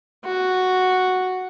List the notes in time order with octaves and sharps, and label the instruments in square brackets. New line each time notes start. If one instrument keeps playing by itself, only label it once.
[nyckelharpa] F#4